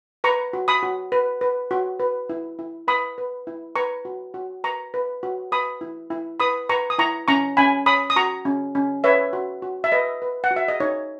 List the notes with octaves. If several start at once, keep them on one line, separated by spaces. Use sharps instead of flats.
B4 A#5 C#6
F#4
B5 D#6
F#4
B4
B4
F#4
B4
E4
E4
B4 B5 D#6
B4
E4
B4 A#5 C#6
F#4
F#4
B4 A#5 C#6
B4
F#4
B4 B5 D#6
E4
E4
B4 B5 D#6
B4 A#5 C#6
D#6
E4 A#5 C#6
C#4 A#5 C#6
C#4 G#5 B5
C#5 B5 D#6
D#6
F#4 A#5 C#6
C#4
C#4
B4 C#5 E5
F#4
F#4
E5
B4 D#5
B4
F#5
F#4
E5
D#5
D#4 C#5